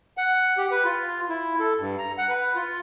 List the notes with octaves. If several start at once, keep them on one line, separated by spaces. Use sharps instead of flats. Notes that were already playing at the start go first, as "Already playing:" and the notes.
F#5
G4
B4
F4
E4
A4
G2
A#5
F#5
B4
F4